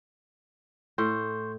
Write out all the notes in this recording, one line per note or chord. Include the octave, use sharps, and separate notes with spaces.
A2 C6 C#6 G6